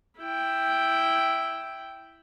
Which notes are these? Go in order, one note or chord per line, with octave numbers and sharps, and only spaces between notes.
E4 G5